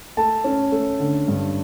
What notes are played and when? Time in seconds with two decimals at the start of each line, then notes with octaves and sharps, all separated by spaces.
0.17 A3 A5
0.44 C#4
0.72 A3
1.00 D3
1.28 G2